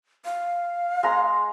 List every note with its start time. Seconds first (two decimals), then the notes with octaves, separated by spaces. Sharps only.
0.25 F5
1.03 G#3 A#5 C6